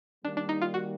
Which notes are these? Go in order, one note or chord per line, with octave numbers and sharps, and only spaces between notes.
D#3 G3 A#3 D4
D4
D#4
F4
F#4